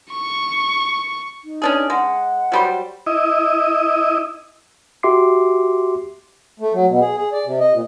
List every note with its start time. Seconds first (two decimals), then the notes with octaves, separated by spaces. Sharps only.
0.12 C#6
1.44 D#4
1.62 C#4 D4 G#4
1.90 G#3 F#5
2.52 F#3 G3 C5
3.06 E4 D#5
5.03 F#4 G4 E5 C6 D6 C7
6.60 A3
6.73 F#3
6.88 B2
7.01 G#4
7.17 G#4
7.33 D5
7.46 C3
7.60 D#5
7.73 A#2